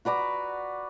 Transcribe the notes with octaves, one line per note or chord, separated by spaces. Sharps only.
F#4 B4 D5 A#5